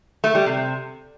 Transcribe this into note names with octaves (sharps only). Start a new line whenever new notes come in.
A3
G3
C3